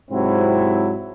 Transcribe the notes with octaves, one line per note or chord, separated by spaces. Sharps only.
G#2 C3 F#3 C4 E4